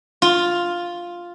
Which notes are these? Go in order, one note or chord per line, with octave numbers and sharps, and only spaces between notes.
F4